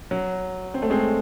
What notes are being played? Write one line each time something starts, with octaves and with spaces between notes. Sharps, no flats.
F#3
C4
A3
G#3 C4